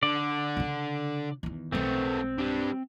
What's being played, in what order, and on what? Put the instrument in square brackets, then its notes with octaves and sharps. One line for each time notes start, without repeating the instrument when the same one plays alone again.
[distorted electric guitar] D3 [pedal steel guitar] D5
[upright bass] C#3 D4
E2 D#3
[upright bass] B1 G#3 [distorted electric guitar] A3 B3 [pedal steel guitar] C4
[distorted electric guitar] G3 D4